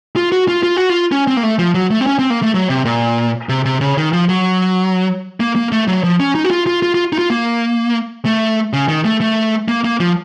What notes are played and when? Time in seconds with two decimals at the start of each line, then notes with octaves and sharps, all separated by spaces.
0.16 F4
0.32 F#4
0.48 F4
0.63 F4
0.77 F#4
0.90 F4
1.12 C#4
1.27 C4
1.37 A#3
1.43 A3
1.59 F3
1.75 F#3
1.91 A3
2.01 C4
2.06 C#4
2.19 C4
2.30 A#3
2.42 A3
2.54 F#3
2.70 C3
2.85 A#2
3.49 C3
3.65 C3
3.81 C#3
3.98 D#3
4.13 F3
4.29 F#3
5.40 A#3
5.56 A#3
5.72 A3
5.88 F#3
6.04 F3
6.20 C#4
6.35 D#4
6.44 F#4
6.51 F4
6.67 F4
6.82 F4
6.95 F4
7.13 D#4
7.19 F4
7.30 A#3
8.25 A3
8.73 C#3
8.89 D#3
9.05 A3
9.21 A3
9.68 A#3
9.85 A#3
10.00 F3